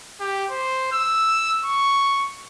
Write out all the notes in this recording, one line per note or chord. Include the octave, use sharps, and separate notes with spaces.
G4
C5
E6
C#6